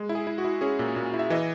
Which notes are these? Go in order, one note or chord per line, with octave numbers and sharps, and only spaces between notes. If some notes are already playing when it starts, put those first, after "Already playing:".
Already playing: G#3
E4
G#4
E4
F#4
E4
C#4 G#4
A#2
A#2
E4
E5
E3 D#5